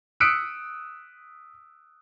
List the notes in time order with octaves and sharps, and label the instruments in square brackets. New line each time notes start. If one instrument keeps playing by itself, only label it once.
[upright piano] D#6 E6 F#6 B6 C#7 D7